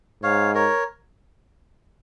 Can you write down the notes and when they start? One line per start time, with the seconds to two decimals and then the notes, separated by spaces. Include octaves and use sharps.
0.22 G#2 C#5 F5
0.54 A#4 C#5